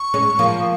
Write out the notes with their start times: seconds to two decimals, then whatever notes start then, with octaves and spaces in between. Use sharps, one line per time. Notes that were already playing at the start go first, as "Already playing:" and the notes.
Already playing: C#6
0.14 G#3 C#4
0.39 F3 A#3